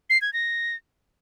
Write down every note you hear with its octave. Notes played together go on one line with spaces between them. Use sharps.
C7
G#6
A#6